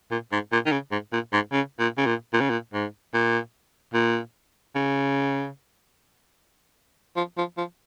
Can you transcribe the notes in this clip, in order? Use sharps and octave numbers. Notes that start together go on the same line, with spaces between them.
A#2
G#2
A#2
D#3
C#3
G#2
A#2
G#2
C#3
A#2
C#3
A#2
A#2
C#3
A#2
G#2
A#2
A#2
C#3
F3
F3
F3